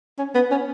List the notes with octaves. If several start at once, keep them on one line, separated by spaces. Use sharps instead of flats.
C#4
B3
C#4